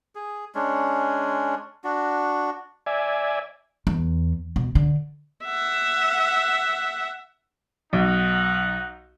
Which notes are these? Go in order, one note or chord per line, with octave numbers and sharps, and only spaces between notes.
G#4
G#3 C#4 D4
D4 F#4
D5 E5 G#5
E2
B2
D3
E5 F#5
B1 D#4 F#5